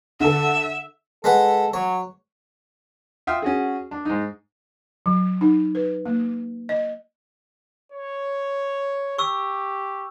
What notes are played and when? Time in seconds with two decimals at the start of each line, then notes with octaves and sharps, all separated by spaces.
0.20 D3 A4 E5
1.24 G#3 A4 B4 F#5
1.73 F#3 C#5
3.27 F4 E5 F5 G5 D#6
3.42 C#4 F#4 G#4
3.91 D4
4.05 G#2 D#4
5.06 F#3
5.41 D#4
5.75 B4
6.06 A#3
6.69 D#5
7.92 C#5
9.18 G4 C#6 E6